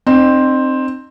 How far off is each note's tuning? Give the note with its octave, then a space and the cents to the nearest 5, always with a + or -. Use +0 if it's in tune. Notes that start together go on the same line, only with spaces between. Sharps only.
C4 +5 D#4 -35